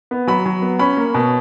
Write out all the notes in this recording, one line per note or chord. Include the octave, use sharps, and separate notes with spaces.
B3
F#3 B5
F#3
B3
C#4 B5
A#3
B2